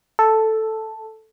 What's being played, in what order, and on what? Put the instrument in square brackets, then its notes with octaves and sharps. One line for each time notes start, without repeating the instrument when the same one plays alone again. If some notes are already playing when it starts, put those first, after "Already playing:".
[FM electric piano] A4